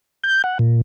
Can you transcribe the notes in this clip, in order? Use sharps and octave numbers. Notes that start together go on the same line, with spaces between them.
G6
F#5
A#2